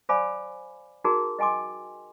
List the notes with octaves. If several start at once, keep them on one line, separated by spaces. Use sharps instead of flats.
C5 D5 F5 G#5 B5 D6
D#4 F#4 G#4 A#4 A#5
D#5 G5 G#5 C6 D6